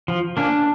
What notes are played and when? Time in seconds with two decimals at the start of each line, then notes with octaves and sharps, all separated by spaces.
0.08 F3
0.37 A#3 C#4 D4